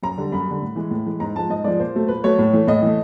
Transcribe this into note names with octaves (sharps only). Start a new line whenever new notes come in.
F#2 A#5
D3 G3
F#2 B5
D3 G3
A2
E3 G#3
A2
E3 G#3
G#2 A#5
F3 G#3 A5
G#2 D#5
F3 G#3 D5
A#2 C5
F#3 A3
A#2 B4
F#3 A3 C#5
A2
E3 A3
A2 D#5
E3 A3